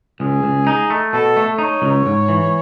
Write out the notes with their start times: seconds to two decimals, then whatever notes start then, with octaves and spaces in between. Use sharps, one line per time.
0.20 C#2 G#4
0.44 C#2
0.67 D#4
0.90 A3
1.13 B2 A4
1.37 A3
1.59 D#4 C#5
1.82 C#2
2.06 G#2
2.29 E3